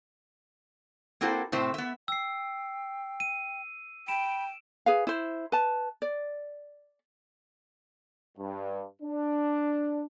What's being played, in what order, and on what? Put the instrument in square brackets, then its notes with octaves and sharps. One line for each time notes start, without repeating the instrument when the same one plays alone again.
[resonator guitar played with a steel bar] A#3 C4 E4 F#4 A4 C5
A2 C3 A3 C4 C5 E5
B3 E5
[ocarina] G5 [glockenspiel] E6 C7
[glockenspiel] D#7
[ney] G5 [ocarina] B5 [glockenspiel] D7 E7
[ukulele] G#4 B4 F5
E4 C5
B4 A5
D5
[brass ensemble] G2
D4